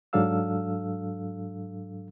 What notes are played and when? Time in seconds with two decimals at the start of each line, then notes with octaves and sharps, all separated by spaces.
0.13 G#2 F#3 D4 A4 F5 E6